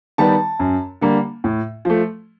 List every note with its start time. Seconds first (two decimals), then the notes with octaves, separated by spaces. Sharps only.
0.18 D#3 G3 B3 A5
0.59 F#2
1.01 D3 G3 A#3
1.44 A2
1.85 F3 A3